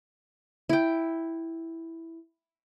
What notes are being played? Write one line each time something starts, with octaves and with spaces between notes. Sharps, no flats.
E4 G5